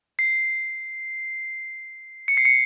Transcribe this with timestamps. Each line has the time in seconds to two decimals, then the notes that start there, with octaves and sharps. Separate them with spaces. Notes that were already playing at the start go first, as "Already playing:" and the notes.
0.19 C7
2.28 C#7
2.37 C7
2.45 C#7